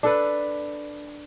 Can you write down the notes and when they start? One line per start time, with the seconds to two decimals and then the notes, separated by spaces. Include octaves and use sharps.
0.03 D4 A4 B4